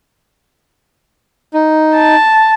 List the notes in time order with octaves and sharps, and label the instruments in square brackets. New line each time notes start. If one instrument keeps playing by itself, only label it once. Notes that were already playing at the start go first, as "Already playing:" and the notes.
[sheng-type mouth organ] D#4
[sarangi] A5